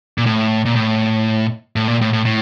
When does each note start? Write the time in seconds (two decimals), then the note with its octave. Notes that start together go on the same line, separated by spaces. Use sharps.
0.18 A#2
0.26 A2
0.65 A#2
0.76 A2
1.76 A2
1.88 A#2
2.01 A2
2.13 A2
2.26 A2